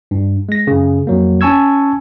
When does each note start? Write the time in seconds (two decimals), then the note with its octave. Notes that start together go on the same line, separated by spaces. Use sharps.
0.11 G2
0.49 G#3 A#6
0.67 F#2 C#3
1.07 F2 F#3 A#3
1.41 C#4 G#5 A5 C#6 E6 G#6